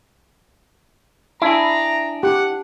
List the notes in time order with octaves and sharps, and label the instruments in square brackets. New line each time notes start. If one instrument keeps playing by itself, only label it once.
[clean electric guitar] D4 G#4 [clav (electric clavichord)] E4 [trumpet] A#5
[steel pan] G4 [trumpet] F#5